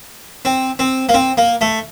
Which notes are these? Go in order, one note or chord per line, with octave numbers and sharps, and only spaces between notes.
C4
C4
A#3
C4
A#3
A3